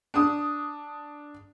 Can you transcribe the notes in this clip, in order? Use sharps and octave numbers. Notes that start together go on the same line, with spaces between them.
D4 D#6